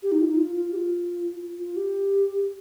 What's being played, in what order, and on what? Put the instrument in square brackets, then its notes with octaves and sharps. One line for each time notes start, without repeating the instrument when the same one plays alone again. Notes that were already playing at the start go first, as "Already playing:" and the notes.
[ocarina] G4
D#4
F4
D#4
F4
F4
G4
F4
F4
G4